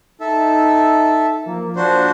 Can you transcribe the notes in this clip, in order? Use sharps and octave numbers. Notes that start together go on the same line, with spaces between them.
D#4 A4 E5
F3 A#3
A#1 F3 D4 F#4 C5